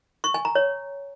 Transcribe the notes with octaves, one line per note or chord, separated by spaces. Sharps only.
C#6
G#5
A#5
C#5